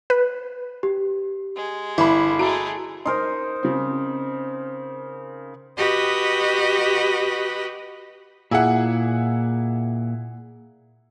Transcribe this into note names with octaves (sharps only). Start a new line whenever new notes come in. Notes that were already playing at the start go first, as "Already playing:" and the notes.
B4
G4
G#3
G1 E4 B5
G#3 A3 F#4 A#5 B5 D7
D#4 A#4 C5 C6
C#3 C4
F#4 G4 B4 D#5
A#2 E4 G#4 F#5